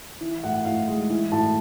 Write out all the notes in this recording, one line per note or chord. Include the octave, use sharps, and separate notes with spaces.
E3
A2 F#5
A2 F5
G#3
E3
A2 A5